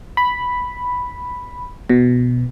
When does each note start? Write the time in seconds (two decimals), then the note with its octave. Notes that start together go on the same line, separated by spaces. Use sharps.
0.17 B5
1.90 B2